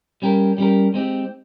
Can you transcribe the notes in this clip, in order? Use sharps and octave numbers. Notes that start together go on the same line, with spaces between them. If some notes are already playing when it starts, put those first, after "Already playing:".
G3 C#4 G4 A#4
G3 C#4 G4 A#4
G#3 C4 D#4 G4